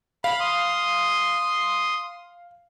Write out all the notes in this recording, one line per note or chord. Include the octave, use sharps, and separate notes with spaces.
F5 B5
C6 D#6